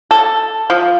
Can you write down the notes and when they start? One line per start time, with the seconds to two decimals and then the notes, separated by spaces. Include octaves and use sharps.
0.11 A4
0.70 F3